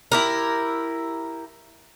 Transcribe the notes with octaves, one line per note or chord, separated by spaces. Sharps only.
E4 G4 A#4